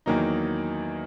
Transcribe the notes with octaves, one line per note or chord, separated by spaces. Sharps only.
E2 D#3 F#3 A#3 D#4